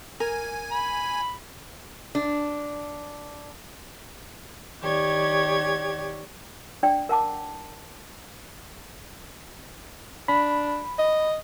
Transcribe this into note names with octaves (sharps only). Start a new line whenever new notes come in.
A#4 G#5
B5
D4
D#3 G4 C#5 D5 G#6
D4 D5 G5
A#4 F#5 A5 D6
D4 B5
D#5